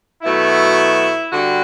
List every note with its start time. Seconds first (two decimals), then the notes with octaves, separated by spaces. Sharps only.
0.23 B2 F#3 A3 E4
1.31 D3 G3 F#4